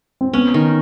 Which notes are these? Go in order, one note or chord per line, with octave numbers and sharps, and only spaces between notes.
C4
B3 C#4
D#3